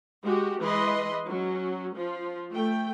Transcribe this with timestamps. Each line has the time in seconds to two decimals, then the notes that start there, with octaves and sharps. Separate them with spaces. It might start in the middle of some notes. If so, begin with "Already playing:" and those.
0.22 G#3 F#4 G4
0.60 E3 G#3 B4 D#5 C6
1.26 F#3 C#4
1.95 F3 F4
2.52 A3 G5